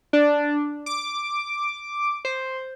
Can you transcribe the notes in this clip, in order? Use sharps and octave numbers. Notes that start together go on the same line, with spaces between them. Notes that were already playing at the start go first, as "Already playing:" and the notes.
D4
D6
C5